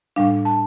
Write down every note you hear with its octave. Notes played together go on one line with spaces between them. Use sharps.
A2 G3 D4 F5
A5